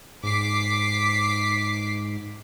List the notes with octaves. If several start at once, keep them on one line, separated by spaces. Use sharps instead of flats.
G#2 D6 B6 C7